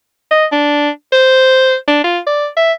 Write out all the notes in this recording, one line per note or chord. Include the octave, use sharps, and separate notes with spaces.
D#5
D4
C5
D4
F4
D5
E5